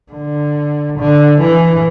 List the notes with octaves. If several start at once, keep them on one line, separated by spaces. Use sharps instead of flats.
D3
D3
E3